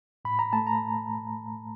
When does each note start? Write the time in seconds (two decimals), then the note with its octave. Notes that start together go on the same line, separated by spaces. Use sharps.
0.25 A2 B5
0.39 A#5
0.53 A3 A5
0.67 A#5